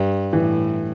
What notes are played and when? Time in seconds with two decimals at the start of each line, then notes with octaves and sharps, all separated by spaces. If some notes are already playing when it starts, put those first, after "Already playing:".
Already playing: G2
0.33 A2 E3